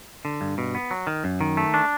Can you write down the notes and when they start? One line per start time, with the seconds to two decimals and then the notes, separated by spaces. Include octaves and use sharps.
0.25 D3
0.41 G2
0.58 B2
0.75 B3
0.91 F#3
1.07 D#3
1.24 F#2
1.41 D#3
1.57 A3
1.74 D4